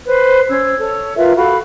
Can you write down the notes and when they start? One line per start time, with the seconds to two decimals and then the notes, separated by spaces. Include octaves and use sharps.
0.06 B4 C5
0.50 C#4 C5 E6 G#6
0.79 A4 C#5
1.17 F4 A#4 B4 E5
1.36 F#4 A4 F5 B5